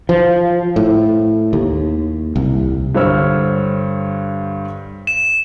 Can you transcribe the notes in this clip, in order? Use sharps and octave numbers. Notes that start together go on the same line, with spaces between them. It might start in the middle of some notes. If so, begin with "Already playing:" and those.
F3
A2
D#2
C2
G2 D3 C5 C#5 E6 F6
E7